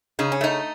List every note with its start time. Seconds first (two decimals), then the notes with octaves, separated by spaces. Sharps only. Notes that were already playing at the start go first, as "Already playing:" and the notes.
0.19 C#3 D#4
0.32 C#4
0.41 A3 D#4